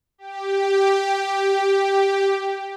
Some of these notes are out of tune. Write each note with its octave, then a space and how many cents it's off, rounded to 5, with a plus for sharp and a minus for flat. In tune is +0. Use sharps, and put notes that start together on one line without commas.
G4 +0